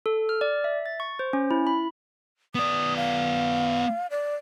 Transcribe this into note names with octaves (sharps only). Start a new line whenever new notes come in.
A4
F6
D5
E5
A6
C#6
C5
C#4
E4
B5
B3 D5 D#6
F5
D5